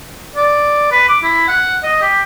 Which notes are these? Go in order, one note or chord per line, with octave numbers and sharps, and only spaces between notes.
D5
B4
D6
E4
F#5
D#5
G4